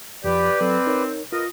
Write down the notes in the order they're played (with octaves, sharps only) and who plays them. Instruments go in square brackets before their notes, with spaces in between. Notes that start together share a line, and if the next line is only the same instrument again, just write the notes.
[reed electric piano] F2 F3 [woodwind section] G4 [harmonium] B4 D5
[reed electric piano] F#3 A4 [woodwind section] C4
[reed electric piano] D#4 A#4 C#5
[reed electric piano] F4 [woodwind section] A#4 B4 D#5